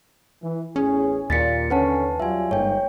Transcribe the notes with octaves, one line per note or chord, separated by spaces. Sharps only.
E3
A1 E2 C#4 G#4
D#2 A#2 A6 B6 C#7
D3 C#4 B4 F#5 A5
F#3 G3 F4 E5 G#5
G1 G#2 G#3 A#3 C#5 G5